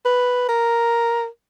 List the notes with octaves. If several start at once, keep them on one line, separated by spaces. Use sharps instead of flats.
B4
A#4